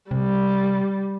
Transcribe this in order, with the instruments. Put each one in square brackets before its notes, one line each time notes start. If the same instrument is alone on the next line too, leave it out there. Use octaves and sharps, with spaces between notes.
[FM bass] C3 [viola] G3